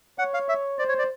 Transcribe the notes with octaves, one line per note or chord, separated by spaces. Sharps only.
C#5 F#5
F5
E5
C5 D5
C#5
D5